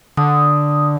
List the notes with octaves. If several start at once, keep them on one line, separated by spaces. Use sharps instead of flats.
D3 D#6